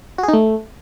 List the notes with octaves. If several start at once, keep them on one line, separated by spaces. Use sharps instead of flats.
F#4
G#4
D#4
A3